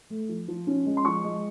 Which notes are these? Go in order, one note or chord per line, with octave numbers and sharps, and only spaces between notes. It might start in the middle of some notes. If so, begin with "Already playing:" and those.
A3
F3
F3
C#4
G#3
C6
F3 C#6
G#3